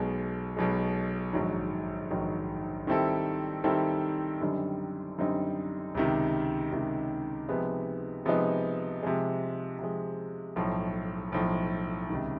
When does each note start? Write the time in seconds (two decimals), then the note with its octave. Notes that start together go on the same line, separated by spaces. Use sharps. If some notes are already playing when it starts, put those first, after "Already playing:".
Already playing: B1 B2 G#3
0.57 B1 B2 G#3
1.33 A#1 G#2 D#3 F#3
2.10 A#1 G#2 D#3 F#3
2.87 D#3 G3 C4 E4 A4
3.64 D#3 G3 C4 E4 A4
4.41 F#2 D3 G3 C4 D#4
5.18 F#2 D3 G3 C4 D#4
5.95 C#2 C3 D#3
6.72 C#2 C3 D#3
7.48 C3 F3 G#3 B3 D#4
8.25 C3 F3 G#3 B3 D#4
9.03 C3 F3 G#3
9.79 C3 F3 G#3
10.56 B1 A2 F3
11.32 B1 A2 F3
12.10 C#2 C3 D#3